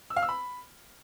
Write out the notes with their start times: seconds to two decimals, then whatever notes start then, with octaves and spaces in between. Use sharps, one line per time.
0.10 E6
0.16 F5
0.23 E6
0.29 B5